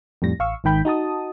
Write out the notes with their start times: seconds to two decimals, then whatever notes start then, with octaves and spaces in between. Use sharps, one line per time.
0.22 F2 A2 G3 A#6
0.39 A1 F5 C#6 E6
0.64 G#1 G#2 D#3 G5 B5 G6
0.85 D#4 F#4 A5 D#6